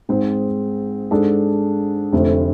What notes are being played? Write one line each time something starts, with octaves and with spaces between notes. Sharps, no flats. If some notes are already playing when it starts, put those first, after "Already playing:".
G#2 G#3 C4 G#4
G#2 G#3 D4 A4
F1 F2 D3 A3 C4